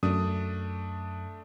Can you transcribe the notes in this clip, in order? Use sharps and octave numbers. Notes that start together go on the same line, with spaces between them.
F#2 A3 D4 D#6